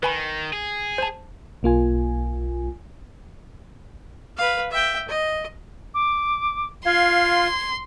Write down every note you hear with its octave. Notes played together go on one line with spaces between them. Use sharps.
D#3 B4 G#5 B5
G#4
C5 A5
B1 A#3 F4 G#5
B4 F5
E5 G5
D#5
D6
F4 F5 C6 G#6